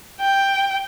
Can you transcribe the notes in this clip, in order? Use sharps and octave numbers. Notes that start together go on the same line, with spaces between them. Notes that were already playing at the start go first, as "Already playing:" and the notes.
G5